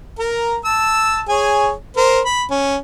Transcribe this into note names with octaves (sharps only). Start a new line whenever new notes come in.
A#4 A#5
A5 E6
G#4 C#5 G#5
A#4 C5
B5
C#4